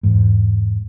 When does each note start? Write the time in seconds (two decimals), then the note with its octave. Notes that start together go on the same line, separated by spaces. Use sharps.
0.03 E2 G#2